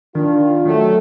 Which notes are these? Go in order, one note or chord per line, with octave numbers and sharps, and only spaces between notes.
D#3 D4 F4
D#3 F#3 A3